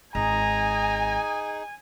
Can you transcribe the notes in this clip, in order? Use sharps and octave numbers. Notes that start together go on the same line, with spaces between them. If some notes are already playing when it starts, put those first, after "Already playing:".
G#1 D#4 G#4 G#5 A#5